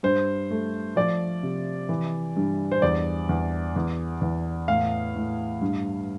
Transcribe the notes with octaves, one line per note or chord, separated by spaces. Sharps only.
G2 C5
A3
F3 D5
C3
E3
G2
C5
E2 D5
E2
E2
E2
A2 F5
A2
G2